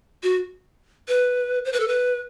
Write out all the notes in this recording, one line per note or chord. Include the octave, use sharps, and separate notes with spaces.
F#4
B4
C5
B4
A4
B4